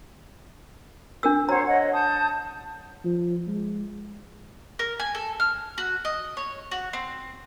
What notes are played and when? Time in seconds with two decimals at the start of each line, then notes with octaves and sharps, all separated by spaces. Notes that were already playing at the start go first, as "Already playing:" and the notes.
1.23 D4 A#4 E6
1.49 F#4 C5 C#5 A#5
1.66 C#5 D#5 F#5
1.92 A5 D#6 G6
3.05 F3
3.47 G#3
4.79 A#4
5.00 G#5
5.15 A4
5.40 F6
5.78 F#4
6.05 D#5
6.37 C#5
6.71 F#4
6.93 C4